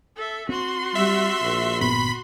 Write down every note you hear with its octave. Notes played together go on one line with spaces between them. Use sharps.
A4 E5
C4 F#4 C6
G3 E5
A#1
G1 A#2 B3 B5